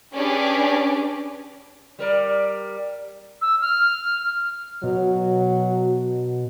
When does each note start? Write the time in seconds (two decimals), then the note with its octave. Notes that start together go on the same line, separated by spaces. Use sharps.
0.13 C#4 D4 G4 G#4 B4 D6
1.99 G3 A#4 D5
3.42 E6
3.62 F6
4.83 B2 F#3